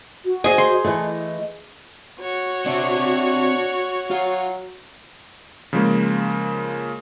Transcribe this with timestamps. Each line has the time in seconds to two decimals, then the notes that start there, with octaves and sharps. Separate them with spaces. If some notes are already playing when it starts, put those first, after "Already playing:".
0.25 F#4
0.44 G#4 C5 D#5 G#5
0.58 C6
0.84 E3 A3 D#5
2.20 F#4 C#5
2.66 C4 D4 E5
4.11 F#3 F4
5.73 C#3 F3 G#3 A#3